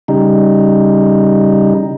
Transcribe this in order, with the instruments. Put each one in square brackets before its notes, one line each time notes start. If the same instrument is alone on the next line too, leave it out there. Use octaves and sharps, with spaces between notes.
[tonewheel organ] C#3 G3 D#4